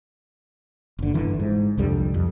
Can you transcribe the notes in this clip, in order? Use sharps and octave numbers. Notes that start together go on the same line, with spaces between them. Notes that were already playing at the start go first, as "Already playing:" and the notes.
F#1 D3
G1 D3 E3
G#2
C2 F2 D3 G3
F2